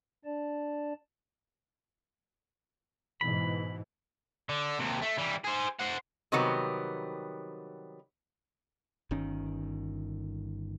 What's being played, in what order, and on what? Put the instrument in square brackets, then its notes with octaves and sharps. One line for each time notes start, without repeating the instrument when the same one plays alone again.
[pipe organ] D4 D5 A5
[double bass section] G#2 B2 E3 [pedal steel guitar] B5
[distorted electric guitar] D3
D#2 C3
A3
E3 G3
G#4 C5
C5 F#5
[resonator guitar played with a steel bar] C3 D#3 F#3 G3 B3
[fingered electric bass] G1 D#3 C#4